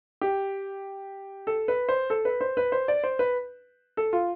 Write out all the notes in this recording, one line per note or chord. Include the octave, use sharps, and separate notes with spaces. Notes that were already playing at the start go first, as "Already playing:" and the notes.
G4
A4
B4
C5
A4
B4
C5
B4
C5
D5
C5
B4
A4
F4